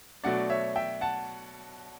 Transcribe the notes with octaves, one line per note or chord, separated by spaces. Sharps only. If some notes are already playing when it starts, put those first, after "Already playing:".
B2 F#3 A3 D4 D5 F#5
C#5 E5
E5 G5
F#5 A5